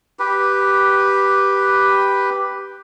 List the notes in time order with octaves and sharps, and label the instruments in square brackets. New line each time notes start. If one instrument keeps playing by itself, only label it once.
[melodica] G4 B4